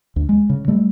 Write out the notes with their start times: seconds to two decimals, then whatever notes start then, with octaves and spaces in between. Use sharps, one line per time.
0.16 D2
0.29 G#3
0.50 C#3
0.68 G3 A3